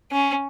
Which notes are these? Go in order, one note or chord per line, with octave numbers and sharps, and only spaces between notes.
C#4